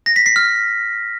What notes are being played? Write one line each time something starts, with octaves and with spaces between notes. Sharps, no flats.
A#6
B6
C7
F6